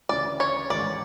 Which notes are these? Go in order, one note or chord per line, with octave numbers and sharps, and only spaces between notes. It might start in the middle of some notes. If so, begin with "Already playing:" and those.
D2 C#3 E3 D5
C#5
A1 G#2 D#3 G#3 C#4 D5